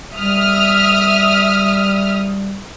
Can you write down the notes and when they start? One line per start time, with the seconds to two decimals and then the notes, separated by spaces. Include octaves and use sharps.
0.15 G3 E5 D#6 F6